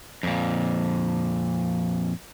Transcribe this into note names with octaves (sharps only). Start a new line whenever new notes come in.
F2 A#2